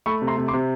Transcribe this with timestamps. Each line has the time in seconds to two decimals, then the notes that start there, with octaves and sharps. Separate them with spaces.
0.06 A3 B5 C#6
0.22 C3
0.27 A#5 C6
0.38 C3
0.48 C6 D6
0.53 C3